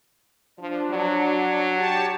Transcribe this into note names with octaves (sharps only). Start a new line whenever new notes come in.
F3 D4
F#3
G4 C#5 A5